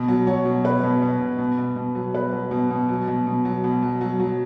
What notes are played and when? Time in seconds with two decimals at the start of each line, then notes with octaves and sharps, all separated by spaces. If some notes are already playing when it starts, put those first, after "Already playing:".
Already playing: B2
0.08 F#3
0.27 F#3 C#5
0.45 B2
0.64 B2 B4
0.83 B2
1.02 B2
1.20 B2
1.39 B2
1.58 B2
1.76 B2
1.95 F#3
2.14 B2 B4
2.33 F#3
2.51 B2
2.70 B2
2.89 F#3
3.08 B2
3.27 B2
3.45 F#3
3.64 B2
3.83 F#3
4.01 F#3
4.20 F#3